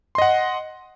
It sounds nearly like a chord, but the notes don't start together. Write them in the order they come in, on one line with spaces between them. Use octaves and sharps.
C6 D#5 F#5